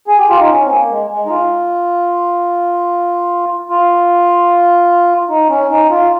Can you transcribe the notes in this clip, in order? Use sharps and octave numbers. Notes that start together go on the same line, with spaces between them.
G#4
G4
F4
D#4
C#4
C4
A#3
G#3
G#3
D#4
F4
F4
D#4
C#4
D#4
F4